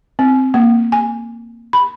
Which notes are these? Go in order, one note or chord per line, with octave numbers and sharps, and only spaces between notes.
C4
A#3
G#5
B5